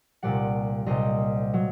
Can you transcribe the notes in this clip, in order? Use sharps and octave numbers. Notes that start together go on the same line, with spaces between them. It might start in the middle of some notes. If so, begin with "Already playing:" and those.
C2 A#2 G3 D5 F#5
C2 A#2 G3 C5 D#5
F#3